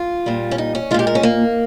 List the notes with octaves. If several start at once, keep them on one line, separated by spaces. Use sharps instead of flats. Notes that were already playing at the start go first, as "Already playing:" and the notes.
Already playing: F4
A#2 G3
C#4
D#4
C#4
A#2 G#3 F4 G4
A#4
C#4
A#3